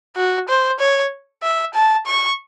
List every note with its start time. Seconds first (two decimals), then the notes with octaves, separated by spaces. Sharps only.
0.16 F#4
0.49 C5
0.79 C#5
1.43 E5
1.74 A5
2.06 C#6